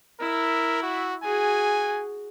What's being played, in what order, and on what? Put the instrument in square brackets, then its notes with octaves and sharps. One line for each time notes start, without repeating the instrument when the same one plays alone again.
[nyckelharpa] E4 E5 [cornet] A#4
[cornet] F#4
[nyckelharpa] F#4 G#4 [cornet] G#5